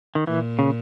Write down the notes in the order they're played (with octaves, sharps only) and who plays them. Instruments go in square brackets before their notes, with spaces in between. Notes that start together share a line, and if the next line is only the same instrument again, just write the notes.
[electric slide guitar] D#3
[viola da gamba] A#2 [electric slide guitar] E3
[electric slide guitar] C#3